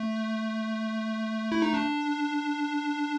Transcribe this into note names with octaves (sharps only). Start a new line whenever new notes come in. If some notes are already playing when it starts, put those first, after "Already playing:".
Already playing: A3
E4
D#4
D4